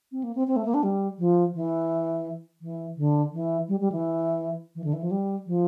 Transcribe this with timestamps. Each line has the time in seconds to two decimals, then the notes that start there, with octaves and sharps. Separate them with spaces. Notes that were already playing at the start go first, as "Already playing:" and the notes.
0.12 C4
0.23 A#3
0.35 C4
0.47 C4
0.56 A3
0.65 A#3
0.74 D4
0.83 G3
1.19 F3
1.54 E3
2.61 E3
2.97 D3
3.32 E3
3.68 G3
3.80 G3
3.92 E3
4.75 E3
4.84 D3
4.93 E3
5.02 F3
5.11 G3
5.47 F3